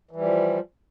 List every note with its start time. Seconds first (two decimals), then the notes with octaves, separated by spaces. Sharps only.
0.11 E3
0.16 G3
0.21 F3